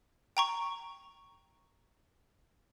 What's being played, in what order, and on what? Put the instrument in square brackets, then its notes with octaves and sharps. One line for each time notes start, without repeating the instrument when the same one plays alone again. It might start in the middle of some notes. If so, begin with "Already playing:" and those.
[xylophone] G5 A#5 C#6